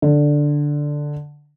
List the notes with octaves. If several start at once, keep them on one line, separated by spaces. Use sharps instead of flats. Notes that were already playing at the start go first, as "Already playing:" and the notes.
D3